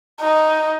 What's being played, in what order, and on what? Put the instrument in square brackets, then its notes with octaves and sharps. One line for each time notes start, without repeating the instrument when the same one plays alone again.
[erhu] D#4